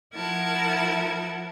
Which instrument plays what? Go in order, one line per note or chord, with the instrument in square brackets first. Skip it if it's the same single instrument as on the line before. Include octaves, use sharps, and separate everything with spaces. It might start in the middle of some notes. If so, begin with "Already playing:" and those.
[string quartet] F3 E4 A#4 F#5 A5 G#6